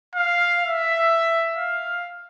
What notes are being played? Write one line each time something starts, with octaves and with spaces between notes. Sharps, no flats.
F5
E5
F5